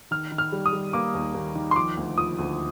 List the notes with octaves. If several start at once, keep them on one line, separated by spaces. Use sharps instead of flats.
D#3 F6
D#3
F6
G3
D#6
G3
A#3 D6
D#2
D#2
D#3
C6
F3 D6
D2
F3 D#6
D2